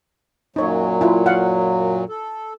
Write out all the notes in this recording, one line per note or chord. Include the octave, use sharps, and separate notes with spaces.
F#2 A#2 F#3 D#4 C#5
E4 F4
F5 F#5
A4